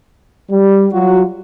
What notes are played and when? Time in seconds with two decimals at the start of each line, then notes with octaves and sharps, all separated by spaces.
0.50 G3
0.92 F#3 F4 F#4